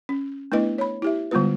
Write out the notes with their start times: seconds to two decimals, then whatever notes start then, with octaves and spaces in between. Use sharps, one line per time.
0.09 C#4
0.52 A3 B3 D4 E4 B4 D#5
0.78 C#5 B5
1.02 E4 G4 E5
1.31 D3 G3 G#3 B3 F4 B4